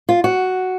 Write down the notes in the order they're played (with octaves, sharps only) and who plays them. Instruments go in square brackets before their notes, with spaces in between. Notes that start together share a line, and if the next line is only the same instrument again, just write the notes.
[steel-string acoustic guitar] F4
F#4